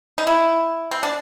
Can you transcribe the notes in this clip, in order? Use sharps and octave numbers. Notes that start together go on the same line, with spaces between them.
D#4
E4
C4
D4